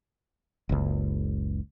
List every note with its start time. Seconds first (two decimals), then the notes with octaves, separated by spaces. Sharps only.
0.69 F#1 C#2